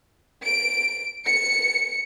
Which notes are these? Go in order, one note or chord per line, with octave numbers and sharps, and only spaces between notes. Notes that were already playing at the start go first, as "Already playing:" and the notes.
D7
C#7